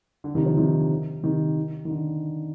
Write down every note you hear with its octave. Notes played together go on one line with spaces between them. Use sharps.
D3
C3 D#3
D3 F3
C3 D#3
C3 D#3
D#3
D3